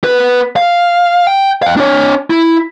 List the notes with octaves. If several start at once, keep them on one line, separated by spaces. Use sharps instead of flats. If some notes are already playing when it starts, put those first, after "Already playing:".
B3 B4
F5
G5
F5 G5
D4 C#5
E4